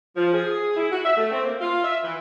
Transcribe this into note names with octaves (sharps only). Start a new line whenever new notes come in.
F3
G#4
E4
F#4
E5
A3
C4
A#3
F4
E5
E3